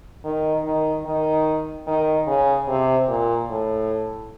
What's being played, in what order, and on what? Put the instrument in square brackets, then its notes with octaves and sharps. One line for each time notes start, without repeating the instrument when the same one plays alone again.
[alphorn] D#3
D#3
D#3
D#3
C#3
C3
A#2
A2